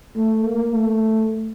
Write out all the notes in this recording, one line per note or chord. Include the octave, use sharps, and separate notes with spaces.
A3
A#3
A3